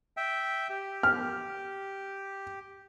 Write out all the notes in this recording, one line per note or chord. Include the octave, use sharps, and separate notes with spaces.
E5 G5
G4
F6